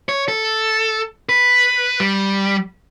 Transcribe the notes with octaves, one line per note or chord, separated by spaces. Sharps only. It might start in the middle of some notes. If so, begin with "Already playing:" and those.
C#5
A4
B4
G3